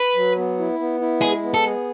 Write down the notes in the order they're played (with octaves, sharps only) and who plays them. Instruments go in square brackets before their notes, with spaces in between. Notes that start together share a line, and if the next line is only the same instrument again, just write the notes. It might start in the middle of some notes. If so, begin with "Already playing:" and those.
Already playing: [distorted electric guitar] B4
[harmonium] F#3
B3
E4
B3
E4
[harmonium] G#3 [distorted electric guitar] G#4
[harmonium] B3
[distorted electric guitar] A4
[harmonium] G#4